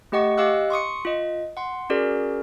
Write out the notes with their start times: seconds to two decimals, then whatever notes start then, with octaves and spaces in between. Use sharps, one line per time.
0.12 A3 G4 D#5 F#5 C#6
0.37 G4 D#5 F5 D6 E6 F#6
0.70 C6 C#6 D#6 C#7
1.05 F4 D#5
1.57 F#5 C6
1.90 C#4 F#4 G#4 A#4 D5